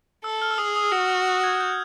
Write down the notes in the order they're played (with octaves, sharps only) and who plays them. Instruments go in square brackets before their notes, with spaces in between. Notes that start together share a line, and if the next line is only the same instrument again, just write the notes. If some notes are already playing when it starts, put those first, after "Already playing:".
[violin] A4 [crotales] E6
[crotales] F6
E6
[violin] G#4 [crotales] D#6
[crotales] D#6
[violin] F#4 [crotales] E6
[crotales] F6
F#6
G#6
G6